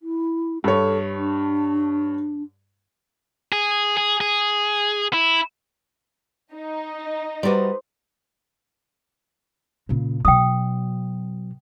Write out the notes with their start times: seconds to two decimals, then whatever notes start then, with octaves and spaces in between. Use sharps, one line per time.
0.01 E4
0.64 G2 A4 C#5
1.17 D4
3.52 G#4
3.97 G#4
4.21 G#4
5.13 E4
6.53 D#4
7.43 G3 F#4 B4 C5 D5 C6
9.89 A#2 C#3
10.25 B2 F#3 G5 D#6